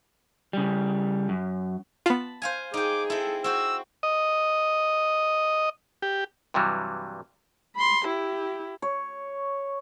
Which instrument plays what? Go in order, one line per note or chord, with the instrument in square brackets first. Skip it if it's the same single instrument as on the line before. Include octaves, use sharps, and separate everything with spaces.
[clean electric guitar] C#3 G3
F#2
[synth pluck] B3 F4 [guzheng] A5 B5
[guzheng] C5 F5 G#5
[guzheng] D#4 G5 [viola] G#4 [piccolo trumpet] D6
[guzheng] C4 E4 [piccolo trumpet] A4
[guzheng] C4 F#4 C5 [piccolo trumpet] E6
[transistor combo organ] D#5
G4
[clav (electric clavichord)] G2 C3 E3 F#3 G3
[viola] B5 C6
E4 G4
[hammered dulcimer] C#5